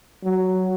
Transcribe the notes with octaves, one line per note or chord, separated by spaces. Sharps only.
F#3